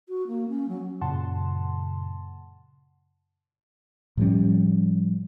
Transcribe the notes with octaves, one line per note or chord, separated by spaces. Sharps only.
F#4
A#3
C#4
F#3
F#2 A#2 C#3 F#5 A5 C6
A2 F3 G3 C#4